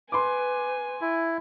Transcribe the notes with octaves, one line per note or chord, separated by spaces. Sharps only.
B4 G#5 C6 D6
E4